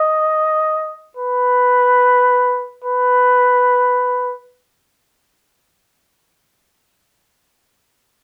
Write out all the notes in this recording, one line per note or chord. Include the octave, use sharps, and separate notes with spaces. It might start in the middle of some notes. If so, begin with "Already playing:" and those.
Already playing: D#5
B4
B4